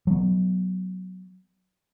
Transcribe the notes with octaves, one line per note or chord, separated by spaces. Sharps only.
F#3 B3